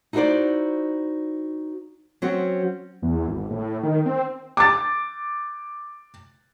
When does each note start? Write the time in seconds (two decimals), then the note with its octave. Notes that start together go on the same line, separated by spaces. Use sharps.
0.13 D#4 E4 F#4 A4 C5 D5
2.22 F#3 C4 C#4 F#4
3.02 E2
3.28 G#1
3.50 A2
3.83 D#3
4.06 C4
4.57 D6 A6